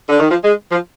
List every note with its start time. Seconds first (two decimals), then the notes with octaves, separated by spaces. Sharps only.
0.09 D3
0.20 D#3
0.31 F3
0.44 G#3
0.72 F3